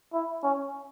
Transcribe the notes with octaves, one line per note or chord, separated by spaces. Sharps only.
E4
C#4